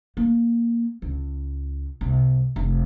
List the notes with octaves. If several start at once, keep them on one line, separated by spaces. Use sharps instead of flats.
A#3
C#2
C2
F1